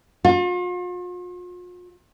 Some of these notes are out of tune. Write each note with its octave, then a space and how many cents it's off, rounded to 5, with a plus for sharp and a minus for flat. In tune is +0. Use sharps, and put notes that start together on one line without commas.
F4 +40